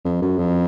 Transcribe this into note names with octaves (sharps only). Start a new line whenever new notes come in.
F2
F#2
F2